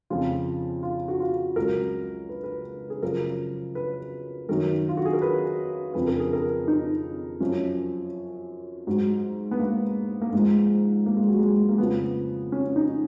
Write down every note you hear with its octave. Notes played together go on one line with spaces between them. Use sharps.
F2 C#3 F3 F4
F4
F#4
F4
C#2 C#3 F#3 A#4
B4
B4
G#4
F#2 C#3 F3 A#4
B4
F#2 D#3 F#3 A#4
F4
F#4
G#4
A#4
B4
F2 C#3 F3 B4
A#4
G#4
A#4
D#4
F#2 F3 C#4
G#2 F#3
B3
A#3
A#3
G#2 F3 G#3
A#3
G#3
F#3
G#3
A#3
F2 C#3 F3 B3
C#4
D#4